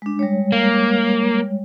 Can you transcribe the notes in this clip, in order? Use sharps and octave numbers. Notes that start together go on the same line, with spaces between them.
G#3 D4
G3 G#3 C#5
A#3